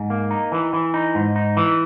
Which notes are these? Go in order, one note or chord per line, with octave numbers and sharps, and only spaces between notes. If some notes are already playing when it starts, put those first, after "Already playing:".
Already playing: G#2
A#3
D#4
E3
E3
D#4
G#2
D#4
E3